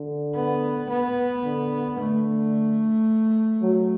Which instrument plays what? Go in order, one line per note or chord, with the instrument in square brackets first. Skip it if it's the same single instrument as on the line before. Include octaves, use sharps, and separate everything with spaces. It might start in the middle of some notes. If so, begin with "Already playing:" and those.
Already playing: [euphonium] D3
[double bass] B3
B3
[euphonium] D3
[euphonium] D3 [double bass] A3
[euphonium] F#3